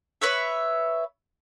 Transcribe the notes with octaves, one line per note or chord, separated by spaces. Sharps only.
B4 C#5 E5